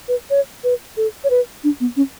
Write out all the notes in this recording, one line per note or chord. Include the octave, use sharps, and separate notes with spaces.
B4
C#5
B4
A4
C#5
B4
D4
B3
C#4